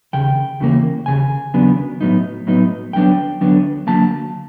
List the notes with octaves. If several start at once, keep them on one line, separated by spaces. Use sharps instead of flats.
D#2 C#3 G5
D#2 C#3 E3 G3 A#3
D#2 C#3 G#5
D#2 C#3 F#3 B3 D4
A2 F#3 B3 D#4
A2 F#3 B3 D#4
D2 D3 F#3 B3 D4 G5
D2 D3 F#3 B3 D4
D3 F#3 A#3 A5